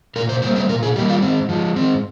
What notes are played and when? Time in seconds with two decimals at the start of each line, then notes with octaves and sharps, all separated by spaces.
0.16 A#2 A#4
0.29 C5
0.42 G3 A#3 C5
0.56 C5
0.69 A#2 A#4
0.83 G#4
0.96 G3 A#3 G4
1.09 F4
1.22 G#2 C4
1.49 F3 G#3
1.76 G#2 C4